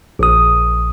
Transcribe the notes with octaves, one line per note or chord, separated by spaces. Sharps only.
A#1 D#6